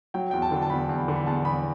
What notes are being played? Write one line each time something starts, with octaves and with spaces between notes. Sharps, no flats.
F#3 G5
E2 G5
A5
D3
A5
E2 B5
E2
D3
B5
E2 A5
E2 B5